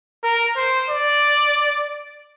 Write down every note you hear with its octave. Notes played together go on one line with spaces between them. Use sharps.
A#4
C5
D5